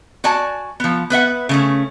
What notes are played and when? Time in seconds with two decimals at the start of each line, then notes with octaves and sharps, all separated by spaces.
0.24 F#4 D5 G#5 A5
0.80 F3 B3
1.10 B3 B4 E5 F#5
1.49 C#3 A3 C#4